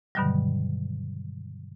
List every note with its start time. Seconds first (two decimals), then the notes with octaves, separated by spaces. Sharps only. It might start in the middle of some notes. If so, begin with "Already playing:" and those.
0.15 G2 B2 D3 D#3 F#3 G3